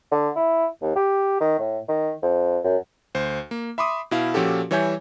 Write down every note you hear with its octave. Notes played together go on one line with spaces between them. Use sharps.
D3
E4
D#2
G4
D#3
A2
D#3
F2
F#2
D2 C5
A#3
E5 B5 C6 D6 D#6
B2 E4 F5
A#2 F3 C#4 F#4 G4 A4
E3 G3 C#5 E5 G#5 G6